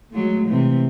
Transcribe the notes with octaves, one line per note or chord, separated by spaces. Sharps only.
F#3 G#3 A3
C3 E3